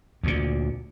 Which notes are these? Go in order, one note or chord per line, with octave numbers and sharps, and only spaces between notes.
D2 A#2